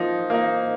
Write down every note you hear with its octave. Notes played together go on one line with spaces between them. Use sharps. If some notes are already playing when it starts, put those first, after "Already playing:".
Already playing: F3 A#3 D#4
A#3 D#4